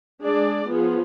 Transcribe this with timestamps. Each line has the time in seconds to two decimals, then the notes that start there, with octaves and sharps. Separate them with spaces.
0.21 G#3 D4 G#4 D5
0.68 F3 B3 F4 G#4